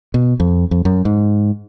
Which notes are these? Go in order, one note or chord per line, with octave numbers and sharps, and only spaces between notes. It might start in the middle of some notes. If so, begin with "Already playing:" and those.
B2
F2
F2
F#2
G#2